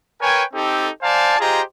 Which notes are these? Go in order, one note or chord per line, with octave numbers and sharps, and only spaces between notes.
A#4 B4 C#5 G5 G#5
C4 D#4 G4 A4
C5 D5 F5 G#5 A5
F4 G4 G#4 C5 D#5 A#5